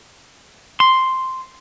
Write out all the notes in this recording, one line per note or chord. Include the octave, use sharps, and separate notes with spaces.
C6